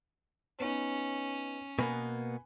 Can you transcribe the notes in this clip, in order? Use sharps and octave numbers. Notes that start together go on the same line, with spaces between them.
B3 C#4 D#4
B2 A#3 B3 B4 G#5 B5